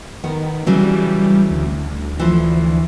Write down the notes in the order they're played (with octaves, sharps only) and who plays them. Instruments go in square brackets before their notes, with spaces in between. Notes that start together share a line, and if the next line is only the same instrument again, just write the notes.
[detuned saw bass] D#3 [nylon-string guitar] B3
[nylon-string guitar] C#3 E3 F#3 [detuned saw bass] G3
[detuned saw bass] D2
[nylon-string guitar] E3 F3